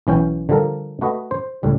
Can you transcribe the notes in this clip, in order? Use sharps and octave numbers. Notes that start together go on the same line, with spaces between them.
B1 E3 C#4 G5
D3 F3 G3 A4 A#4
A3 F#4 B4 D#5
C5
C#2 A2 G3